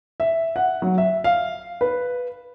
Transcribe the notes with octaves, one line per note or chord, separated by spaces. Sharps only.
E5
F#5
F#3
E5
F5
B4